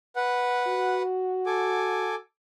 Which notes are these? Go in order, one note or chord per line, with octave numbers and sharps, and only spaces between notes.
B4 F#5
F#4
A4 G#5 D6